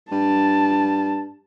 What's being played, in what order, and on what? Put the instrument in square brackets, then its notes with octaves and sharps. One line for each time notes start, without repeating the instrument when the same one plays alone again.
[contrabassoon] G2 [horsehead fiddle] A5